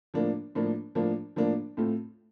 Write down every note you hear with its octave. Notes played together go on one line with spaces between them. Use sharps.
A2 F3 A#3 D4
A2 F3 A#3 D4
A2 F3 A#3 D4
A2 F3 A#3 D4
A2 A3 C4 F4